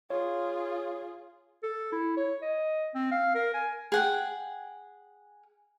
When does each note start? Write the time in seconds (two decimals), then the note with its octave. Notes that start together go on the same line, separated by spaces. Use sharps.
0.10 F4 G#4 C#5
1.63 A4
1.92 E4
2.17 C#5
2.42 D#5
2.94 C4
3.11 F5
3.35 A#4
3.54 G#5
3.92 G#4 F#5 G5